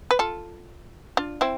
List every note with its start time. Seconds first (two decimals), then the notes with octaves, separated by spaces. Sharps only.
0.11 B4
0.19 F4 A4
1.17 D4 F4
1.41 C4 E4